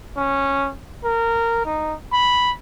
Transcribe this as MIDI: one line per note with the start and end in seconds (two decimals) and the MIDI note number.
0.17 0.71 61
1.04 1.63 70
1.65 1.95 63
2.12 2.52 83